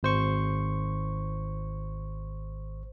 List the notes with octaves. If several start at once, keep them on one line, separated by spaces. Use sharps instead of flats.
G#1 C5 C#6